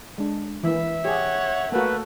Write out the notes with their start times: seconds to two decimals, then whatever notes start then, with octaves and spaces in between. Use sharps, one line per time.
0.18 G#3 D4
0.63 E3 A#3 E5
1.05 G4 G#4 C#5 F#5
1.72 A3 A#3 F#4 B4